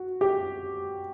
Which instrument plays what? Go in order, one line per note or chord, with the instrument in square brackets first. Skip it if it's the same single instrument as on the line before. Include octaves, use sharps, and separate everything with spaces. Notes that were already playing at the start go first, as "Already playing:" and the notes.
Already playing: [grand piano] F#4
G4